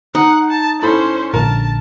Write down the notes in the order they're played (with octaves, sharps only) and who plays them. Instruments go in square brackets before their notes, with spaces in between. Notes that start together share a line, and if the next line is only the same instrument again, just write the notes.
[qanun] D#4 [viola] F#5
[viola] A5
[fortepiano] A2 A4 B5 [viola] C#4 C5
[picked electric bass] A#1 A#2 D3 [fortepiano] A#4 [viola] A5